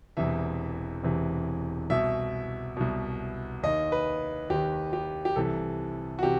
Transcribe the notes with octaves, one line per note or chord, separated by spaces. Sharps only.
E1 E2 C3 E3 E5
E1 E2 C3 E3
C2 B2 E5
C2 B2
D#2 D#3 D#5
B4
D#2 D#3 G4
G4
G4
C2 C3 E3 A4
F#4
C3 E3 G4